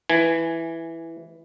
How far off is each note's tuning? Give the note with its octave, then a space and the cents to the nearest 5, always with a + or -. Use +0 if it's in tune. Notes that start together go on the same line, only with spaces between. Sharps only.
E3 +0 G#5 +0